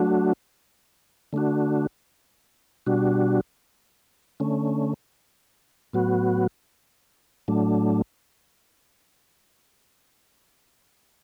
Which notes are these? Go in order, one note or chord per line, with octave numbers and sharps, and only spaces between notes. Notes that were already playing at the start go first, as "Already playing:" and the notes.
Already playing: F#3 A3 D4 F#4
D3 A3 D4 F#4
B2 G3 D4 F#4
D3 A3 C#4
A2 F#3 B3 F#4
A2 F#3 A3 D4